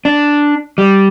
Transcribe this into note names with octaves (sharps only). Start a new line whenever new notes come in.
D4
G3